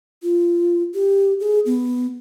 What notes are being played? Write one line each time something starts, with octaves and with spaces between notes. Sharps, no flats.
F4
G4
G#4
B3